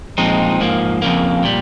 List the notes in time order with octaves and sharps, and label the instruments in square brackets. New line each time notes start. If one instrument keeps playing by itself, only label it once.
[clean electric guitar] A#2 F3 G#3 C4 D#4
G#2 F3 A#3
F2 C#3 F3 A#3
A#2 G3